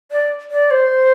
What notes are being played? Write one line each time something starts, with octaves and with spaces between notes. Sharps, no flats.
D5
D5
C5